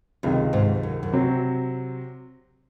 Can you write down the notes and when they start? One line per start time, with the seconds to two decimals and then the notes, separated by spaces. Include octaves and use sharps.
0.23 C#2 F#2 C3 D#3
0.53 G#2
0.83 F#2
1.03 F#2
1.12 C3 F#3 C4